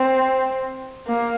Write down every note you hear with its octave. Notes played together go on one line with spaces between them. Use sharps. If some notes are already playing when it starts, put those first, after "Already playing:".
Already playing: C4
A#3